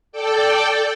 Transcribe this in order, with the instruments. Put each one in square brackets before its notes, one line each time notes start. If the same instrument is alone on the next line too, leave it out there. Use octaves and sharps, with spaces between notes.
[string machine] A4 D5 G5